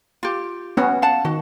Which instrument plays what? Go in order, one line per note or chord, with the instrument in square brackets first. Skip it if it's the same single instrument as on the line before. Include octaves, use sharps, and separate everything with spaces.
[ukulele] F4 G4
[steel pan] B3 C#4 [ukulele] F#4
[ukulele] F5 F#5 A5
[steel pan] D#3 [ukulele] F#4